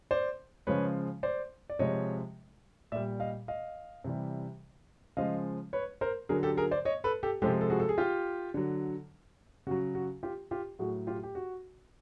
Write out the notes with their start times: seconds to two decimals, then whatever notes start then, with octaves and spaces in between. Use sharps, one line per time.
0.11 C5 D5
0.67 C#3 F3 G#3 B4 C#5
1.23 C5 D5
1.70 D5
1.79 C3 F3 G#3 C#5 D#5
2.92 A#2 D5 E5
2.96 G3
3.20 D#5 F5
3.48 D#5 F5
4.04 C3 E3 G3
5.17 C#3 F3 G#3 D#5 F5
5.73 B4 C#5
6.01 A#4 C5
6.29 D3 F#3 G#4 A#4
6.43 G4 A4
6.57 G#4 A#4
6.71 C5 D5
6.85 C#5 D#5
7.04 A4 B4
7.23 G4 A4
7.42 C3 F3 G#3 G4 A4
7.61 A4
7.70 F#4 G#4
7.80 A4
7.89 G#4
7.98 F4 G4
8.54 D3 F#3
9.67 C#3 F#4
9.71 F#3
9.95 F#4
10.23 F4 G4
10.51 F4 G4
10.79 A2 F#3 F#4 G#4
11.07 F4 G4
11.23 G4
11.35 F#4